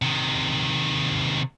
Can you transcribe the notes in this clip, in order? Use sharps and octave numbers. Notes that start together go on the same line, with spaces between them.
C3 D#3